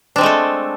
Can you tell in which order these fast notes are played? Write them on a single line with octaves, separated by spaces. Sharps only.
D4 C4 G#3 A3 A4